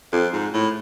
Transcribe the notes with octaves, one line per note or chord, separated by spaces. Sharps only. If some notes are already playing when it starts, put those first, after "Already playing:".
F2
G#2
A2